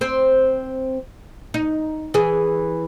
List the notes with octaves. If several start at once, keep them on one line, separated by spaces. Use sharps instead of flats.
C4 C5
D#4
E3 G#4